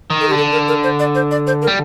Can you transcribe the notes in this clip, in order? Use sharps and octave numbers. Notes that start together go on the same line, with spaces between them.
D#3
A4
D3 G4
A4
A#4
A#4
C5
D5
C5
D5
C5
A#4
G3